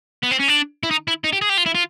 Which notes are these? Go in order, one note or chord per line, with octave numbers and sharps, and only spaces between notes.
B3
C4
C#4
D4
E4
D#4
E4
D#4
G4
G#4
G4
F4
E4
F4